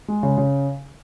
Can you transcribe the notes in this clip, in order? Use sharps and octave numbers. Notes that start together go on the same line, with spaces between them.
G#3
C#3
C#3